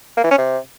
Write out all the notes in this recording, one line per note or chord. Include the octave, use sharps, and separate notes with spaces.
A#3
E3
C#4
C3